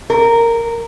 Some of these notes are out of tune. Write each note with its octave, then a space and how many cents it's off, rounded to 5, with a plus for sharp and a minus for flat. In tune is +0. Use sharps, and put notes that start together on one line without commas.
A#4 -10